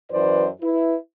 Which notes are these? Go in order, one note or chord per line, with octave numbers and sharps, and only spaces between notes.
F#2 E3 F#4 B4 C5 D5
E4 B4